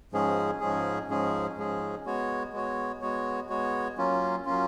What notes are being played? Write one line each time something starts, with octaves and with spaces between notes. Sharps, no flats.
G#2 F3 G#3 C#4 G#4
G#2 F3 G#3 C#4 G#4
G#2 F3 G#3 C#4 G#4
G#2 F3 G#3 C#4 G#4
G#3 B3 F#4 C#5
G#3 B3 F#4 C#5
G#3 B3 F#4 C#5
G#3 B3 F#4 C#5
F#3 A#3 C#4 F4
F#3 A#3 C#4 F4